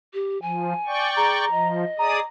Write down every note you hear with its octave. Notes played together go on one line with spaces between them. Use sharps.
G4
F3 G#5
D5 G5 C#6
G#4 A#5
F3 D#5
G#4 D5 A#5 D#6